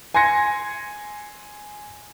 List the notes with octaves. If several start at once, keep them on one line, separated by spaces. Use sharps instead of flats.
G#5 C6 G#6 A#6 C#7